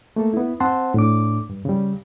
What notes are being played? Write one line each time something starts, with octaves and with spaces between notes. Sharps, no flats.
A3 A#3 A4
B3 E4
C4 C5 F#5 A5 C6
A2 D4 D6
G2
C#3 G3